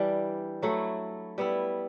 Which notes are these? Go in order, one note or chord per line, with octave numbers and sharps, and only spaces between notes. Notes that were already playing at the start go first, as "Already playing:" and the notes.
Already playing: E3 G3 D4
F#3 A3 E4
G3 B3 E4